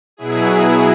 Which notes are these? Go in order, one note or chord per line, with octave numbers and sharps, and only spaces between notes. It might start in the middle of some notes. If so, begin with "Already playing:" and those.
B2 F#3 E4 G#4